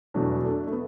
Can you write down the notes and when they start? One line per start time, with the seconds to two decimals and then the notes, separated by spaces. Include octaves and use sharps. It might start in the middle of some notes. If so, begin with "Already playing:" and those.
0.14 E2 B2 F#3 A3 D4 F#4
0.43 A3 D4
0.67 A3
0.72 B3